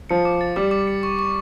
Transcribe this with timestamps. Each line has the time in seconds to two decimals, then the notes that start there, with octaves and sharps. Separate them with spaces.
0.09 F3 C#7
0.25 D6
0.41 A6
0.56 G3 D6
0.71 D6
0.87 C#7
1.03 C#6
1.19 C#6